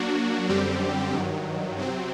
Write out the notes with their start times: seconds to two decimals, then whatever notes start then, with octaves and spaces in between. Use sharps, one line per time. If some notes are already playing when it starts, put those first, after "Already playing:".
Already playing: F#3 A#3 D4 F#4
0.49 F#2 D3 G3 C4 G4
1.14 G2 D#3 F#3
1.78 C3 F#3 C4